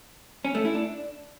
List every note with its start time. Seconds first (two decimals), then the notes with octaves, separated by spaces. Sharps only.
0.45 C#4
0.55 A3
0.65 E4
0.75 D4